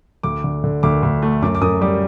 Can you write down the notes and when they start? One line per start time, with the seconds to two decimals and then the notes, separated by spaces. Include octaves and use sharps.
0.23 D2 D6
0.44 D3
0.64 D3
0.83 D2 D6
1.03 D2
1.22 A3
1.42 F#2 D6
1.55 D6
1.61 F#2 D#6
1.81 G3 D6